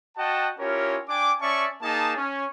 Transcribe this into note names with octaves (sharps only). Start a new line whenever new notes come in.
F#4 D#5 F#5 G5 A5
C#4 E4 F4 G4 A#4 C#5
D4 G5 G#5 D6
C#4 D5 E5 A5 C#6
A#3 D#4 G#4 A5
C#4